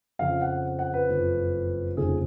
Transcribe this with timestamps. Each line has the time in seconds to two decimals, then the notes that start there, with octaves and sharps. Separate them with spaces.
0.19 F2 C#3 F3 F5
0.41 F#5
0.79 F#5
0.94 B4
1.09 F#1 F2 F3
1.97 F1 D#2 C#3 F3 G#4